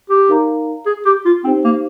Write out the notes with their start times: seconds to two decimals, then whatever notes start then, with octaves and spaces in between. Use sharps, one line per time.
0.09 G4
0.29 D#4 A#4 D5 F5 A#5
0.86 G#4
1.05 G4
1.25 F4
1.44 C4 D#4 G4 C5
1.64 A#3